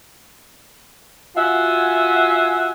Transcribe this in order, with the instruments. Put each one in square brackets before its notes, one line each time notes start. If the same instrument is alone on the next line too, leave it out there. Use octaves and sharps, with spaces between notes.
[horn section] F4 F#4 E5 F#5 G#5